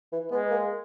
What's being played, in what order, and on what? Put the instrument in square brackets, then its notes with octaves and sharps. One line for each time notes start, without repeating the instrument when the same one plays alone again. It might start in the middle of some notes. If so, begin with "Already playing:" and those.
[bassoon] E3
[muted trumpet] G#3 [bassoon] B3
[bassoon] A#3